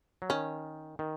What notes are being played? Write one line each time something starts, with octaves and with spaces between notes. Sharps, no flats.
F#3
D#3 C#4
D#3